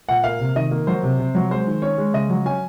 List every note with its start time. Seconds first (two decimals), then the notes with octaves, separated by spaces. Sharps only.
0.09 A#2 F#5
0.24 A#3 F5
0.40 C3
0.55 D#3 D#5
0.71 A#3
0.87 F#3 C5
1.03 C3
1.19 C3
1.35 F#3
1.51 G#3 C5
1.67 D#3
1.82 C#4 C#5
1.98 G#3
2.14 C#3 D#5
2.29 F#3
2.45 C#4 G#5